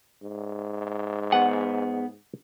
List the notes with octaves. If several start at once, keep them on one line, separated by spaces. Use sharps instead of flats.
G#2
B3 G#4 F#5